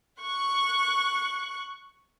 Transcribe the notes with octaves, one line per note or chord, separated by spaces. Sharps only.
C#6 F#6